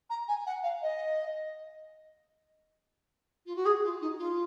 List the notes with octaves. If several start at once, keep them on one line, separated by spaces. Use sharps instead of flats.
A#5
G#5
F#5
F5
D#5
F4
F#4
G#4
F4
D#4
F4